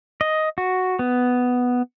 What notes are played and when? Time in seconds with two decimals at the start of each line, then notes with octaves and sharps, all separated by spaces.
0.21 D#5
0.58 F#4
0.99 B3